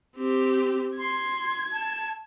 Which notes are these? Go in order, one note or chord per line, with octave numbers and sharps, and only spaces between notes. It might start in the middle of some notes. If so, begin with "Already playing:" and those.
C4 G4
C6 G#6
A5